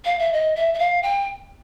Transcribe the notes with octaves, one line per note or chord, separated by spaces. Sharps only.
F5
E5
D#5
E5
E5
F5
G5